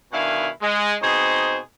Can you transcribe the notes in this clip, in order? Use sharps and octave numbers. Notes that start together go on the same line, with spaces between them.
B2 D#3 D4 E4 F5 G#5
G#3
B2 C4 D#4 G#4 C5